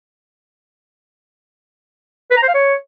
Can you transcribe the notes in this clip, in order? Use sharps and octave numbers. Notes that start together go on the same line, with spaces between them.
B4
A#5
C5
F5
C#5